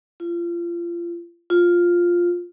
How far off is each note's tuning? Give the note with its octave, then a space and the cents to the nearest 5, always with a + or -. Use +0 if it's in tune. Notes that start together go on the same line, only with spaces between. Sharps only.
F4 -30
F4 +5